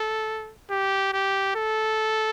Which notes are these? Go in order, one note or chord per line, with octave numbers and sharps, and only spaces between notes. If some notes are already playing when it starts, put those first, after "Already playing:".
Already playing: A4
G4
G4
A4